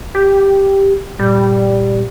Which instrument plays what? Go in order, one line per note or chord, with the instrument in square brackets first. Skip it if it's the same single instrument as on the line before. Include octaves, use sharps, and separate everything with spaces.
[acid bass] G4
[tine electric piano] G2 A#2 [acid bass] G3